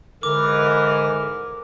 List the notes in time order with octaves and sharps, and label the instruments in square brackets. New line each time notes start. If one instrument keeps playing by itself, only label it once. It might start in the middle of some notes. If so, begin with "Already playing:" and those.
[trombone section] G#2 E3 [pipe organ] D3 [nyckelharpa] A#4 [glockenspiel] D6